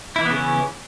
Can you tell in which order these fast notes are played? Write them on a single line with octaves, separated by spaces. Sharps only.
E4 E3 B3 C#3 C#4